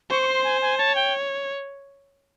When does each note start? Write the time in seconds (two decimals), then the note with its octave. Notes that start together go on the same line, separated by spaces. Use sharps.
0.10 C5 C#6
0.22 C#6
0.28 C6
0.44 G#5
0.62 G#5
0.78 C#5 A5
0.95 G5